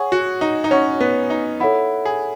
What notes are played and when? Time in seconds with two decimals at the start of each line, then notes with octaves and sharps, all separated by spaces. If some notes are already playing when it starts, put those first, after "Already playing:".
Already playing: G#4 C#5 F#5 C#6
0.12 F#4
0.41 D#4
0.64 D#4
0.71 C#4 C#5 F#5 C#6
1.00 B3
1.30 D#4
1.60 E4 A4 C#5 F#5 B5
2.05 G#4